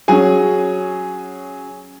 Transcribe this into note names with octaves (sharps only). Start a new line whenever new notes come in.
F#3 C#4 G#4 G#5